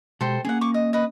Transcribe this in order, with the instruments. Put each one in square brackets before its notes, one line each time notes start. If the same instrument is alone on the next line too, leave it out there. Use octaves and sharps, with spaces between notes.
[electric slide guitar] B2 G#3 G4 [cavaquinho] A4 C5 G5
[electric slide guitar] A#3 C#4 [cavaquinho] G#4 F#5
[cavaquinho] C#6 D6
D#5
B4 D#5